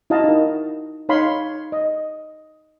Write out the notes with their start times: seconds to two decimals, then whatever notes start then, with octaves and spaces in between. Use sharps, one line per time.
0.10 E4 F#4 D#5 F5 A5 A#5
0.24 D#4 A#4
1.09 D#4 C#5 F5 B5 C6
1.72 D#5